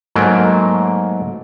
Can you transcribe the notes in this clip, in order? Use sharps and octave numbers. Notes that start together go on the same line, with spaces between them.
G#2 F#3 A3 A#3 G5